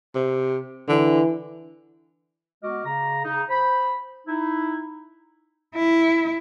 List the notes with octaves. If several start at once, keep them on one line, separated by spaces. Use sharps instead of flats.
C3
D3 E3
G#3 B3 F#4 D#5 D6 F6
C#3 A#5
C#3 D#4
C5 B5
D#4 E4
E4